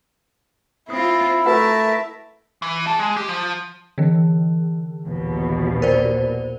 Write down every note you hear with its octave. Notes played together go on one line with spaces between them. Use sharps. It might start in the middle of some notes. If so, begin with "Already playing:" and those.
C4 E4 F4 D#6
A3 F#4 A#4 B4 E5 F#5 A5
E3
G#4 A5
G#3
G4
F3
D3 E3
A#1 D#2 B2
A#4 C5 D5